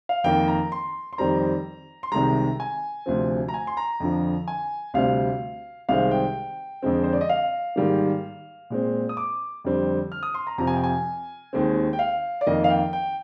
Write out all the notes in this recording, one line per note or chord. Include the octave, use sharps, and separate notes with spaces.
F5
F2 D#3 A#3 G5
A#5
C6
C6
F2 D#3 G3 C4 A#5
C6
C2 C3 D#3 G#3 A#5
G#5
D2 C3 F3 C4
A#5
G#5
C6
A#5
F2 D3 F3
G#5
D2 C3 G3 C4 F5
C2 C3 D#3 G#3 C4 F5
G5
F2 D3 G#3 C4
C5
D5
D#5
F5
G#2 D#3 G3 A#3
A#2 G#3 C4
D#6
D6
F2 D3 G3 C4
F6
D#6
C6
A#5
F2 C3 F3 C4 A#5
G#5
G5
G#5
D#2 D#3 G#3 C4
G5
F5
D5
F2 D#3 A#3 D#5
F5
G5
G5